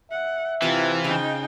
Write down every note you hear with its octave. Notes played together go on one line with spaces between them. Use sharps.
E5 F#5
C3 E3 E4 F4 F5 A5
C#3 D#4 F5 G5